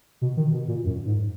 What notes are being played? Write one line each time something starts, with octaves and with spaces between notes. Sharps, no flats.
B2
D#3
B2
A#2
F#2
G#2